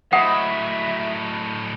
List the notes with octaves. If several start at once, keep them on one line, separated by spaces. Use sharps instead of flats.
A2 F#3 D#5 E5 F#5 B5